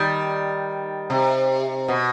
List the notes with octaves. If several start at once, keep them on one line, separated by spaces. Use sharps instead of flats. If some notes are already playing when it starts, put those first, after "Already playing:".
Already playing: D#3 G3
C3
B2